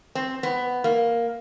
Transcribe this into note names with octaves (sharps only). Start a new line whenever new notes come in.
C4
B3
A#3